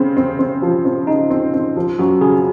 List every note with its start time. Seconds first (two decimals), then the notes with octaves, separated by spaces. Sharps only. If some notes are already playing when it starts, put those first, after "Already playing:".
Already playing: C#3 C4 C#4
0.17 C4
0.39 C4
0.62 F3
0.85 C4
1.07 C#3 D#4
1.30 C4
1.54 C4
1.77 F3
1.99 F#2 F#4
2.21 C#3 G#4